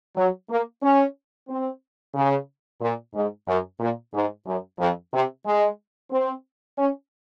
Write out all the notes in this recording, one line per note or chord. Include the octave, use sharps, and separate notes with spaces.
F#3
A#3
C#4
C4
C#3
A#2
G#2
F#2
A#2
G#2
F#2
F2
C3
G#3
C4
C#4